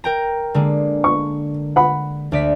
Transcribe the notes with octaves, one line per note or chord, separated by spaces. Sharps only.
A#4 G5 A#5
D3 G#3 A#3
C#6
F#5 B5
D2 D5 B6